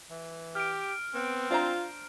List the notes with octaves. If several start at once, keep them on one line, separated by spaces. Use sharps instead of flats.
E3
G4 F6 D7
B3 C4
D4 F4 C5 A#5